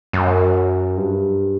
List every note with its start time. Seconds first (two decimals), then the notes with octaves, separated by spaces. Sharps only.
0.13 F#2
0.97 G2